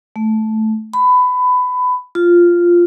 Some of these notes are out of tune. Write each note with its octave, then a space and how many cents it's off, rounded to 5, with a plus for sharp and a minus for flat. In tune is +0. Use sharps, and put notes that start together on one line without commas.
A3 -10
B5 +20
F4 -5